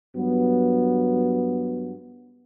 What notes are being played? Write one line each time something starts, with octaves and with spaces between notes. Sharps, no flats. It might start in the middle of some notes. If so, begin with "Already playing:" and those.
G2 F#3 B3